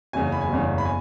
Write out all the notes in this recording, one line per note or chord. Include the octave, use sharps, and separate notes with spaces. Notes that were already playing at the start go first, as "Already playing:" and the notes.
F#1 E2 C#3 G#5
B5
G#5
F#1 E2 C#3
B5
G#5